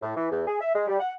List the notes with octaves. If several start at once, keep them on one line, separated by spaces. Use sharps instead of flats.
A2
E3
E2
G#4
E5
G#3
G3
F#5